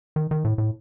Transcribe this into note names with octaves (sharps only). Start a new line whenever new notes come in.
D#3
D#3
A2
A2